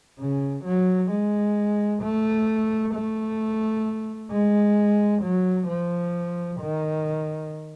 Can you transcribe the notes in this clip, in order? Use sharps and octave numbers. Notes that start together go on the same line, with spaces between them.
C#3
F#3
G#3
A3
A3
G#3
F#3
F3
D#3